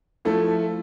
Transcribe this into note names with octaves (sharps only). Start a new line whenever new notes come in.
F3 A3 E4 A4